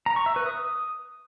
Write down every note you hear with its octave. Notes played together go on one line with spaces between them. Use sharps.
A#5
C#6
E5
B4
D#6